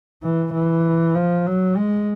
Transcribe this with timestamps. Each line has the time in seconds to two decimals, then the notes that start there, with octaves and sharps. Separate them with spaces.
0.22 E3
0.54 E3
1.15 F3
1.46 F#3
1.77 G#3